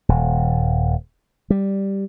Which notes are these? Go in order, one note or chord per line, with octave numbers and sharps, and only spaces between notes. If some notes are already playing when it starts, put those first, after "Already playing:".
D#1
G3